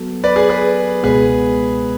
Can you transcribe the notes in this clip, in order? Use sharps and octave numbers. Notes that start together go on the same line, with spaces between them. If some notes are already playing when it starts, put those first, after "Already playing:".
Already playing: F#3 B3 F#4 A4
B4 D5
G#4 B4
G#4 B4
C#2 B2 G#3 B3 G#4 B4